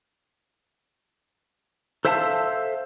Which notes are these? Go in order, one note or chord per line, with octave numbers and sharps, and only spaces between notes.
A4 C5 E5 F5 G5 A5